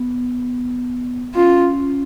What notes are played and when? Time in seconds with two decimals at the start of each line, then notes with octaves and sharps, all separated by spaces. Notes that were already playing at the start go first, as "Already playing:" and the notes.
Already playing: B3
1.35 C#4 F4